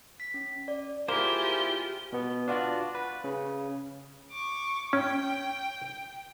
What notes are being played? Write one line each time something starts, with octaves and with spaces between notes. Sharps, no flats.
B6
C#4
D5
A#3 E4 F4 G4 G#4 C5 G7
B2 B3
D4 F4 F#4 D5
B4
C#3
C#6 D6
C#4 G5